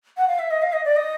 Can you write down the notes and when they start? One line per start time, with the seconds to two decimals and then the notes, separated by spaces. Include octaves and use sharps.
0.17 F#5
0.28 F5
0.39 E5
0.51 D#5
0.62 F5
0.73 D#5
0.85 D5
0.96 D#5